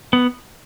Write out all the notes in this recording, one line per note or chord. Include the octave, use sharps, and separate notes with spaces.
B3